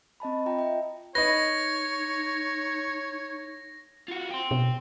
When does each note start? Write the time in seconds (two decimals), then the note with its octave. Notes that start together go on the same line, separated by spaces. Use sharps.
0.20 C4 D#5 A5 B5
0.46 F4 G5 A#5
0.58 D#5 E5 G5
1.15 D#4 B4 C#5 D#5 A#6
4.08 F4 F#4
4.31 G5 C6
4.51 B2